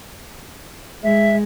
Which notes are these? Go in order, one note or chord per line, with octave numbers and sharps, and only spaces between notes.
G#3 E5